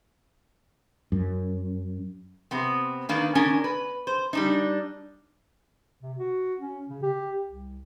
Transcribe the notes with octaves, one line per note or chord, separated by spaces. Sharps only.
F#2
C3 B3 C4
D#3 A#3 D4 B4
D#3 C#4 D4 A#4 G#5
B4
C5
G3 D4 D#4
C3
F#4
C#4
C#3
G4
C2